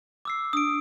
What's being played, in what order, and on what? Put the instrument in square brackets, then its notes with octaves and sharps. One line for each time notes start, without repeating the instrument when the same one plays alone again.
[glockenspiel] D6 E6 C7
[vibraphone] D4 [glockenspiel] D#6 D7